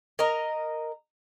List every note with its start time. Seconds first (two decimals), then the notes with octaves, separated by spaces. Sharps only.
0.19 A#4 D#5 A#5